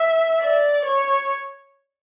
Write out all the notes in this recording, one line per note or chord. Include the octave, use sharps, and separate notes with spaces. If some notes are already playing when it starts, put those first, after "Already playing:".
Already playing: E5
D5
C#5